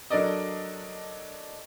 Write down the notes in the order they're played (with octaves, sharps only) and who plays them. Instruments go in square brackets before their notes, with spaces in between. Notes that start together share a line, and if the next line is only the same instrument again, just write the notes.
[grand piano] F#3 D4 A4 A#4 D5 D#5